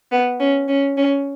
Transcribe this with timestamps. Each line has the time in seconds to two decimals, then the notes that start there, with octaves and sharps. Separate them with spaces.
0.12 B3
0.40 C#4
0.68 C#4
0.97 C#4